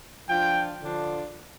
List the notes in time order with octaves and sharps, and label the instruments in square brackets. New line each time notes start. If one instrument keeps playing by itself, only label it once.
[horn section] F3 D4 F4 G5
D3 F3 D4 F4